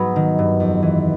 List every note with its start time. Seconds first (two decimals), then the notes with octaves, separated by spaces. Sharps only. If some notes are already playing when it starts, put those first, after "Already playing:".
Already playing: G#2 F#3 B3 B5
0.16 D#3
0.39 G2
0.60 F2
0.82 E3